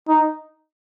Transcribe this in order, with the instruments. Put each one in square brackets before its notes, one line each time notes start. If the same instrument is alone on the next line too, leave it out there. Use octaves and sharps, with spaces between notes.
[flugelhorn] D#4